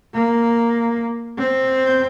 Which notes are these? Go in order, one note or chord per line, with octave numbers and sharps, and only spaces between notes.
A#3
C4